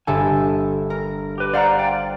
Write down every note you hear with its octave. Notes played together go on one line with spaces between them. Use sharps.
G1 G4 A4 E5 G#5
A#4
G4 B4
C5 D5 F5 F#5 A#5 D6
D5 G5